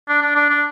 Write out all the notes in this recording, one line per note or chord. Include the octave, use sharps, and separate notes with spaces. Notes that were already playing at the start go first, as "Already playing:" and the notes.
D4
D4
D4
D4